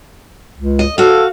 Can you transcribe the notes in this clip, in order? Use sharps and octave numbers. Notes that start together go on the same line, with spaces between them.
C#2
D#5
F#4 A4 F5